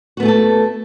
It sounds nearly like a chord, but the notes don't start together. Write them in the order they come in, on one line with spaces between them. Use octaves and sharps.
F#4 B3 A3 G#4 A4